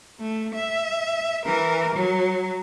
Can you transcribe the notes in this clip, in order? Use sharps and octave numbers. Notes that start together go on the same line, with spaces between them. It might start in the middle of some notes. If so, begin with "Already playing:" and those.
A3
E5
E3 A#4
F#3